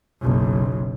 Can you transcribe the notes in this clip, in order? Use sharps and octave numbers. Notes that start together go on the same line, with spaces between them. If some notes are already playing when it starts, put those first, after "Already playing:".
F#1 B1